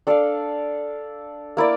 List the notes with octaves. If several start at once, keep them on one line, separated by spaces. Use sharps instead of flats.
D4 A4 D5 F5
A#3 E4 A#4 D5